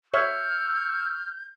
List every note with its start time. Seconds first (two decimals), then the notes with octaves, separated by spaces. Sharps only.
0.14 C#5 E5 C#6 E6 F6 G6